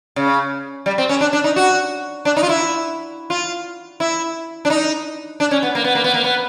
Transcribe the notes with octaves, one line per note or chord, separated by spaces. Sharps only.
C#3
G3
C4
C#4
D4
D4
D#4
F#4
D4
D#4
F4
E4
F4
E4
D4
D#4
D4
C#4
B3
A#3
B3
A#3
B3
A#3
B3